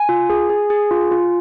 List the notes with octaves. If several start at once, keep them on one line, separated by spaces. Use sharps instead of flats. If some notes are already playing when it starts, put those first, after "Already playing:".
Already playing: G#5
F4
G#4
G#4
G#4
F4
F4